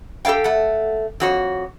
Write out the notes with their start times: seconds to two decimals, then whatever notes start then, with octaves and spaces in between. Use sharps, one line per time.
0.25 G4 A4 C#5 F5 G5
0.44 A3 F#5
1.20 F2 F#4 C#5